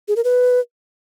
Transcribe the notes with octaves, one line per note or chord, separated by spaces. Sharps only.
G#4
A#4
B4